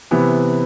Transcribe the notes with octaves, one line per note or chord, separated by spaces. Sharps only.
C3 E3 B3